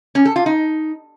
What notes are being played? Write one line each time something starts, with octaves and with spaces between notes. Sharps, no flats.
C#4
A4
F4
D#4